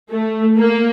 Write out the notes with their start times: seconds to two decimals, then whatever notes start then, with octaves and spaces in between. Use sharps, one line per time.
0.12 A3
0.58 A#3